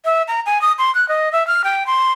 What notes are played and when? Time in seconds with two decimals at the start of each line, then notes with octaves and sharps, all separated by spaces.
0.05 E5
0.28 A#5
0.46 G#5
0.62 D#6
0.79 C6
0.95 F#6
1.09 D#5
1.33 E5
1.47 F6
1.64 G5
1.87 C6